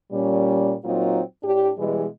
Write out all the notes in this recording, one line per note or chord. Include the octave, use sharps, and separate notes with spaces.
A#2 G3 C#4
A#2 F#3 A#3 C4 D#4 F4
A2 D4 G4
B2 E3 G3 G#3